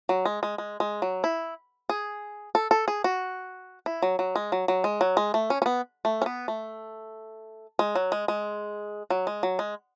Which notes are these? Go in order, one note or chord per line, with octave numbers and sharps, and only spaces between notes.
F#3
G#3
G#3
G#3
G#3
F#3
E4
G#4
A4
A4
G#4
F#4
E4
F#3
F#3
G#3
F#3
F#3
G#3
F#3
G#3
A3
C#4
C#4
B3
A3
C#4
B3
A3
G#3
F#3
G#3
G#3
F#3
G#3
F#3
G#3